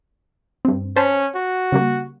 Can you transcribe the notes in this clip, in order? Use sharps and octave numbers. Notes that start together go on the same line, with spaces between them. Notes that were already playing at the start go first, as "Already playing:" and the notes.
G2 C4
C#4 C5 A5 B6
F#4
C#3 G3 A#3